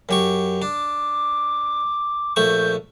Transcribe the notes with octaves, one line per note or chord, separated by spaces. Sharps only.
F#2 G4 C#6
D4 D6
A#1 A3 C#6 G6